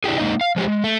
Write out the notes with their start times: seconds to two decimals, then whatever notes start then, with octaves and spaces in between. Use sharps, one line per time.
0.04 D4 E4 G4 G#4
0.18 G#3 A#3 D#4 D#5
0.41 F5
0.56 F3 G#3 G4 C5
0.68 G#3
0.84 A3